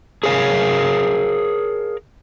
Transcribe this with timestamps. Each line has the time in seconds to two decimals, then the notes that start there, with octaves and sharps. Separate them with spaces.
0.24 G#4 A#4 C#5 F5